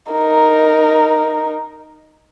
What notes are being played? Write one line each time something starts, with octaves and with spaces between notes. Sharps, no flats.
D#4 A#4